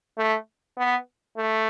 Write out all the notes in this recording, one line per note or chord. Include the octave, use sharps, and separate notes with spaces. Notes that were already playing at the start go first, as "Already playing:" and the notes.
A3
B3
A3